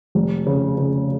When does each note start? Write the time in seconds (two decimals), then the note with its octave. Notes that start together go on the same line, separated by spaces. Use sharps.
0.15 F1
0.46 C#3
0.78 C#3